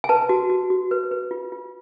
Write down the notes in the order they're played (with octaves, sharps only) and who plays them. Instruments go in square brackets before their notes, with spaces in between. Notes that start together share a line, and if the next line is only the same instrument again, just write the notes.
[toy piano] G#5
B4 A5
F#4
F#4
F#4
B4
B4
F4
F4